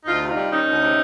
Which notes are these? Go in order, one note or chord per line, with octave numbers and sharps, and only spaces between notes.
D2 D#4 F4
C3
D#4 F4
G3
D#3 C#4 D#4
D2
C3